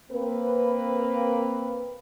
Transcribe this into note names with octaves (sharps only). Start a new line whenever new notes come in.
A#3 C4 B4